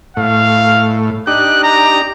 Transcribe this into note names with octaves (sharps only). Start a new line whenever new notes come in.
A2 F5
D4 D#4 G4 F#6
A#5